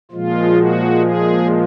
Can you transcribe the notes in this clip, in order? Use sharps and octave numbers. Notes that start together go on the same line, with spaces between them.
A#2 F3 G#3 F4
F#4
G#4